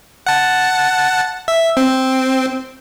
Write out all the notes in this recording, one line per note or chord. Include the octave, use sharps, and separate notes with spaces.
F#5 A5
E5
C4